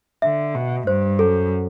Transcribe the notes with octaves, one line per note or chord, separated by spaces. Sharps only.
D3 E5
B2
G2 C5
F#2 A4